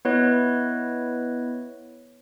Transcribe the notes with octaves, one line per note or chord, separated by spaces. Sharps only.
B3 E4 B4 C#5 D#5